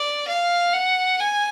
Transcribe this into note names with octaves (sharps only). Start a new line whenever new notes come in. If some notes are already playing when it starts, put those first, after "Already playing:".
Already playing: D5
F5
F#5
G#5